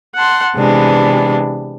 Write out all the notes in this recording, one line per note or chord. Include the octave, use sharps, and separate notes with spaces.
F#5 A5 C6
C3 E3 G#3 B3 D4